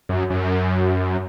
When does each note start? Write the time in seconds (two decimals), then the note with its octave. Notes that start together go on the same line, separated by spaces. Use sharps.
0.09 F#2
0.30 F#2